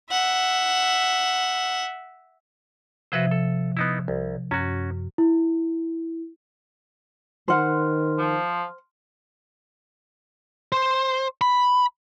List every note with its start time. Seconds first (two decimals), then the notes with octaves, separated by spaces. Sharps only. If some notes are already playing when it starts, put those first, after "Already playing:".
0.11 E5 F#5
3.12 C3 F3 F#4 B4 C5 E5
3.31 A4
3.77 B3 D#4 E4
4.08 C2
4.51 F#2 C#4 F#4
5.18 E4
7.48 D#3 C5 F#5 C6 F6
8.19 F3
10.72 C5
11.41 B5